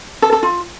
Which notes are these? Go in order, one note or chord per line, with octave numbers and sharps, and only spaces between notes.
A4
A4
F4